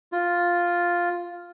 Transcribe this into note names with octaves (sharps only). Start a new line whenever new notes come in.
F4